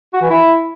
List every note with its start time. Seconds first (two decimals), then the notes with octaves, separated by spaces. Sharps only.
0.13 F#4
0.21 E3
0.30 E4